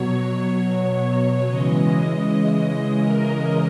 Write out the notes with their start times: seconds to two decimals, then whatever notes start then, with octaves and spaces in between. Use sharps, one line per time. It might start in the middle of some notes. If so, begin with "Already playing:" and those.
Already playing: B2 F#3 C#5
0.44 C#5
1.47 C#3 E3 G#3 D#5
2.50 D#5
3.03 A#4